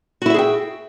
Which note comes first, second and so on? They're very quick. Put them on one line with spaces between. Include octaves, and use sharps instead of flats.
F#4 E4 E5 G#4 G5